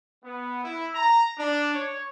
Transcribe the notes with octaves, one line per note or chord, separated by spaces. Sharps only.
B3
E4
A#5
D4
C#5